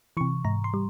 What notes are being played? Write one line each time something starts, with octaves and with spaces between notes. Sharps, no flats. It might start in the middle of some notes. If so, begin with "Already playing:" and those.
C3 E3 C#6
G#2 A#5
C6
G3